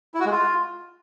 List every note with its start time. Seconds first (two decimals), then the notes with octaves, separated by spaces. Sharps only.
0.14 E4
0.20 F#4
0.25 G#3
0.31 F4